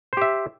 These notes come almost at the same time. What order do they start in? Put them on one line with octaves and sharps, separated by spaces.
C5 G4 E5